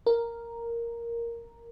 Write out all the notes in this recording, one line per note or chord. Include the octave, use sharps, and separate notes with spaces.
A#4